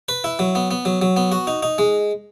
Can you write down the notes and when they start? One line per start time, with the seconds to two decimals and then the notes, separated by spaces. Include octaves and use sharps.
0.09 B4
0.24 E4
0.39 F#3
0.55 B3
0.71 B3
0.85 F#3
1.02 F#3
1.17 B3
1.32 F#4
1.47 D#4
1.63 D#4
1.78 G#3